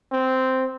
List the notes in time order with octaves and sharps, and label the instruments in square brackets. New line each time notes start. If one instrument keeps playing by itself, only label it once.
[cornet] C4